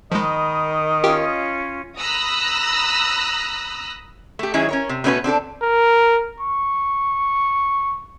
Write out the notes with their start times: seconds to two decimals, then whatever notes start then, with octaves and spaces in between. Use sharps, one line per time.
0.12 D#3 F3 G#3 D#5 B5
1.04 C#4 F4 G4 A#4 G5
1.98 A#5 B5 D#6 E6 F#6 A#6
4.39 A3 G4
4.54 D#3 F#3 G#3 C#4 E4 G#4
4.69 C#4 A#4 C#5
4.89 C3
5.04 B2 A3 C#4 D4 F#4 B4
5.24 C4 D4 G4 A4
5.63 A#4
6.41 C#6